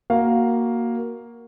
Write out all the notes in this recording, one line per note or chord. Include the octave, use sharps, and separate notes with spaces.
A#3 F#4 F5